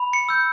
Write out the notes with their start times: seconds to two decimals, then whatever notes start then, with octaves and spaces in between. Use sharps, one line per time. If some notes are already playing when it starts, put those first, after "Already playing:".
Already playing: B5
0.13 C#7
0.29 E6 G6